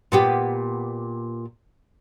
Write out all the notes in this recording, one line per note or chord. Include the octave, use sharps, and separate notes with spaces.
A#2 B3 G4